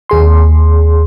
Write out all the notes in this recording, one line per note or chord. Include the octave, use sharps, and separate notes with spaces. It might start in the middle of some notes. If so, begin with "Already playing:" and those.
D#2 G#4 C6